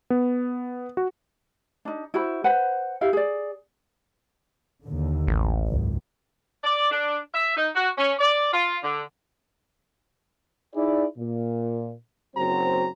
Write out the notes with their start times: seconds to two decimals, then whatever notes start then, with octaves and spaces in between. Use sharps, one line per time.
0.10 B3
0.97 F#4
1.85 D4 D#4
2.14 E4 F#4 C5 B5
2.44 B4 C5 F#5
3.01 E4 G4 F5
3.13 G#4 D5
4.84 D#2 D3
5.27 A1
5.67 G#1 C#2 F#2
6.64 D5
6.91 D4
7.34 E5
7.56 D#4
7.75 F#4
7.98 C#4
8.19 D5
8.52 F4
8.82 D3
10.75 D#4 E4 G#4 D5
11.17 A#2
12.36 F#1 F#3 C4 F#4 C5 A#5